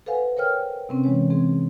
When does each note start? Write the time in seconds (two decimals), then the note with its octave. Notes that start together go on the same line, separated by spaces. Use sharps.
0.06 A4 B4 C5 F5 F#5 G#5
0.37 A#4 C5 C#5 G5 F6
0.89 C3 C4 C#4
1.04 E3 G#3 C#5
1.30 C4 G#4